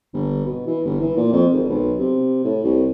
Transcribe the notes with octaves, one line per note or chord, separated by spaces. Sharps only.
G1
B2
E3
G1
E3
A#2
F2
G#1
B1
C3
A2
C2